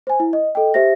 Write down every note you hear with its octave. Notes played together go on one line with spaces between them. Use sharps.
C5 G#5
E4
D#5
A4 D#5 G5
G4 C5 E5 A#6